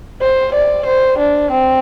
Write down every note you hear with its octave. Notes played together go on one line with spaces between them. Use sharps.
C5
D5
C5
D4
C4